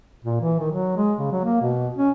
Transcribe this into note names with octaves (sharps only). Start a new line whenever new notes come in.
A#2
E3
D#3
F#3
G#3
C#3
F#3
A#3
B2
C#4